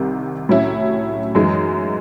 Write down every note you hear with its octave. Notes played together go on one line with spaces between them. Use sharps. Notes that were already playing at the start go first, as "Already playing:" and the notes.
Already playing: C2 C3 D#3
A2 F#3 C#4 E4
F#2 E3 G#3 D#4